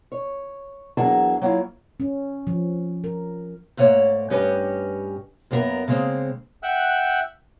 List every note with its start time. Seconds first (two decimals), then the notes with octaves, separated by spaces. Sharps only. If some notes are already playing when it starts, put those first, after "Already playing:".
0.12 C#5
0.97 E2 F#3 A#3 D4 G#4 A5
1.41 F#3 A#3 E4 F4
2.00 C#4
2.47 F3
3.04 A#4
3.77 G#2 A3 A#3 C#5 D5
4.30 G2 C#4 G4 B4 D#5 G#5
5.51 F#2 A#3 B3 F#4 A#4
5.88 C#3 G#3 A#3 C4
6.63 E5 F#5 G5 E6 F#6